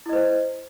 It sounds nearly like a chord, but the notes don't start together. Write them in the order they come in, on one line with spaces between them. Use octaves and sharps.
E4 D#5 C5